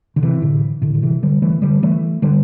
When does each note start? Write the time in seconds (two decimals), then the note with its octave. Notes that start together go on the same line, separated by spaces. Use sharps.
0.16 D3
0.22 C3 E3
0.42 A2 D3
0.82 A2 D3
0.94 D3
1.02 C3 E3
1.23 D3 G3
1.42 E3 A3
1.62 D3 G3
1.83 E3 A3
2.22 D3 G3